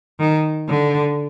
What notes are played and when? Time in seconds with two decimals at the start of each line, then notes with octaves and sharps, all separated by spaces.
0.20 D#3
0.69 D3